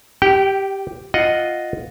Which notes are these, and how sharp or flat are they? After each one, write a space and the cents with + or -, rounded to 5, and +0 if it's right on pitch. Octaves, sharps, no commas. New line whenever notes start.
G4 +0 G5 -25
F4 +0 D#5 +0 F#5 +0